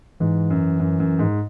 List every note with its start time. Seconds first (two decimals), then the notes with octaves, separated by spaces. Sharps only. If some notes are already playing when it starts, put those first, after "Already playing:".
0.20 G#2 E3
0.50 F#2
0.80 F#2
1.00 F#2
1.19 G#2